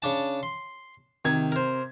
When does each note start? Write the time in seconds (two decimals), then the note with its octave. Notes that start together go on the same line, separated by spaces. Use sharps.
0.02 C#3 D4 A5
0.43 C6
1.25 C3 D#3 G#6
1.52 A#4 C5